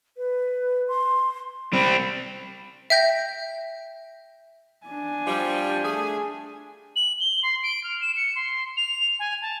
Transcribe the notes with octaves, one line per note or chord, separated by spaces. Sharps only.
B4
C6
G3 C4 B5
E5 G5 G6 A#6
D4 G#5
F3 G3
A3 G#4
F#7
G7
C6
D7
F6
E7
C#7
C6
F7
G#5
A5